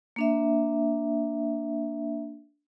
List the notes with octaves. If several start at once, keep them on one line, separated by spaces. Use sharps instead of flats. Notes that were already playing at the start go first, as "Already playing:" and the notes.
A#3 D4 E5